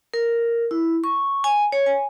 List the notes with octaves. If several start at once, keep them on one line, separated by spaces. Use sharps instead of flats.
A#4
E4
C#6
G#5
C#5
G#5